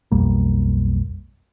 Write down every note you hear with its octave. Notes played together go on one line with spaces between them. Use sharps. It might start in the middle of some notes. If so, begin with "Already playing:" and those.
B1 F2 G3 A#3